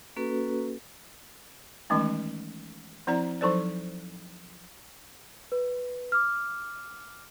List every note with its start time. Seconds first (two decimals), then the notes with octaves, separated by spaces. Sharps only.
0.16 A#3 C#4 F#4 A4 B4
1.90 D#3 E3 G#3 A3 C#4 D#4
3.07 F3 C4 E4 D5 A#5
3.41 F3 F#3 D#4 A4 C5 D5
5.52 B4
6.12 D6 F6